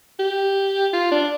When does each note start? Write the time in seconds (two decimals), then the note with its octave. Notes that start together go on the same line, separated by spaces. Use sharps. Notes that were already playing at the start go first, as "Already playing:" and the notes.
0.20 G4
0.93 F4
1.12 D4